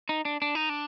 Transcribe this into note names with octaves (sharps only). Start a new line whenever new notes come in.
D#4
D4
D4
D#4
D4